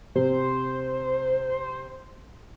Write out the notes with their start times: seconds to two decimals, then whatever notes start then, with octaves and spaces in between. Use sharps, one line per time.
0.15 C3 C5